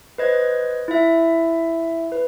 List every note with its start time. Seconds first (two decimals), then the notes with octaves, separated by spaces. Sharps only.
0.18 B4 C5 D#5 F#6 G#6
0.88 E4 E5
2.12 B4